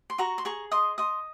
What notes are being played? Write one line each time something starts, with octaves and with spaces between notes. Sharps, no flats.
C6
F#4 A#5 C#6
C6
G#4 A#5 C#6
D#5 C6 D#6
D#5 C6 D#6